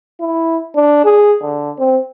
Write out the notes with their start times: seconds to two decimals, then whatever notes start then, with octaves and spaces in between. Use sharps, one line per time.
0.20 E4
0.75 D4
1.05 G#4
1.42 D3
1.79 C4